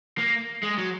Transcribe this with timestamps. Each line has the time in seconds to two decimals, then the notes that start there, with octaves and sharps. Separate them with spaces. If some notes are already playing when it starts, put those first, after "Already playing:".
0.18 A#3
0.63 G#3
0.78 F#3